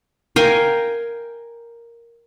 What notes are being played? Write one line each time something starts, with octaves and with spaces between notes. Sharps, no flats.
A#4 F5 G5 G#5